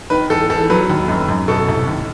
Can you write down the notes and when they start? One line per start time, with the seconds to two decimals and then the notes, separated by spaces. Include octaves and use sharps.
0.10 D#3 B4
0.30 E2 A4
0.50 E2 A4
0.70 F#3 B4
0.90 D#2
1.08 F#2
1.29 F#2
1.48 B2 A4
1.68 C2
1.87 D#2